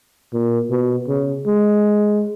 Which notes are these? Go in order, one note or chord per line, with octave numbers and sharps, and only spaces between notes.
A#2
B2
C#3
G#3